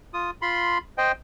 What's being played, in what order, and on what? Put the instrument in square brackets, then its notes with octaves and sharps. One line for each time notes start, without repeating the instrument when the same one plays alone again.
[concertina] F4 D#6
F4 B5 C6
C5 D#5 G5